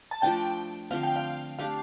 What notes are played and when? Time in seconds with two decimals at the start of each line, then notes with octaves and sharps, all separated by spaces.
0.11 A5
0.22 F3 A3 D4 G5
0.91 D3 F3 C4 F5
1.03 G5
1.16 F5
1.59 A3 D4 G4 F5